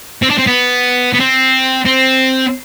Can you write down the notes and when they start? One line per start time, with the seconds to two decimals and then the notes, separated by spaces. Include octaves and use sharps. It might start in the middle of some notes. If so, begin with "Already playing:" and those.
0.23 C4
0.31 D4
0.39 C4
0.48 B3
1.14 B3
1.21 C4
1.86 C4